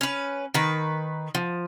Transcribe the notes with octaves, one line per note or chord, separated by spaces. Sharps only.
C#4 B4
D#3 B4
F3